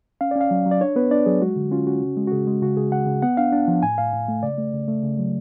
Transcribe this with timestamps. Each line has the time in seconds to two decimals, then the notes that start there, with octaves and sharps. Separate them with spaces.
0.21 C#4 F5
0.31 C#4 D5
0.41 F5
0.51 F#3
0.66 F#3
0.71 D5
0.81 D4 C#5
0.96 B3 B4
1.11 D4 D5
1.26 F#3 G#4
1.41 G#3 F#4
1.56 D3
1.71 C#4 F4
1.87 C#4 F#4
2.01 C#3
2.17 G#3
2.27 F#4
2.32 C#3 G#4
2.47 G#3
2.62 C#3 F#4
2.77 C#3 G#4
2.92 C#3 F#5
3.07 C#3
3.22 B3 F#5
3.37 D4 F5
3.53 D4
3.68 F3
3.83 A2 G#5
3.98 A2 F5
4.13 A2
4.28 A3
4.43 C#3 D5
4.58 A3
4.73 C#3
4.88 A3
5.03 C#3
5.19 F#3